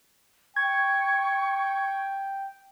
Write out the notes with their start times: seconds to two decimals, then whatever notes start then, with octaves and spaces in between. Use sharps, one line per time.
0.56 G5 C#6 G#6